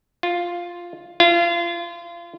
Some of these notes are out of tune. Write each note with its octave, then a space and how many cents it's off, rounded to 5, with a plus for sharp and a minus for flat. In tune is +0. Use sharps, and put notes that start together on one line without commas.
F4 +0
F4 -30